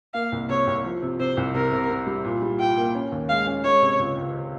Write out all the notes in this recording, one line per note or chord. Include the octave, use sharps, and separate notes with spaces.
A#3 F5
C2
C3 C#5
C2
F3
C3
C3 C5
C2
C3 A#4
C3
C3
G3
A#2
G3
F4 G5
A#3
C#4
D#2
G#3 F5
C#4
G#3 C#5
C3
C#2
C#2